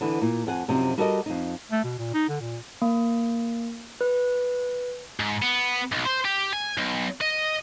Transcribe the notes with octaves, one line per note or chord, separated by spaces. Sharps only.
D3 E3 B3
A#2
F2 F#5 G#5
F#2 C3 F3 D#4
G3 F#4 A4 A#4 C#5 D#5
F2 D#4
A3
B2
A#2
D#4
D3
A#2
A#3
B4
G#2
B3
B1
C5
G4
G#5
B1
D#5